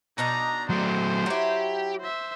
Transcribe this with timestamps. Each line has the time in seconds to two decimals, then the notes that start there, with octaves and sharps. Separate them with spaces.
0.18 B2 D4 D#4 A#5
0.70 F#3 A3 C5
1.26 F#3 E4 G4
2.00 C5 E5